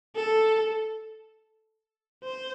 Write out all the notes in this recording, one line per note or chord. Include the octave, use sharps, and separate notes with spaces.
A4
C5